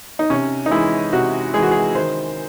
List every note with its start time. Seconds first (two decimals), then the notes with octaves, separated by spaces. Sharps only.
0.19 D#4
0.30 C3 C#4
0.66 D#4
0.71 E3 G#3 E4
1.13 C3 F#4
1.54 E3 G#3 G#4
1.62 F#4
1.71 G#4
1.95 D#3 C5